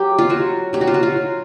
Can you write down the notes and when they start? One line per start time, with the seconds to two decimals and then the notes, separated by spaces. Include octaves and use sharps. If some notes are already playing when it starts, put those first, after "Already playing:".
Already playing: F#3 G4
0.18 F4
0.29 F#3 F#4
0.73 F#3 G4
0.81 F#4
0.87 F4
0.94 F#4
1.03 F4
1.17 F#3